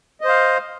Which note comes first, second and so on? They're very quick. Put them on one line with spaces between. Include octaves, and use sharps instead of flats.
D#5 C5 F5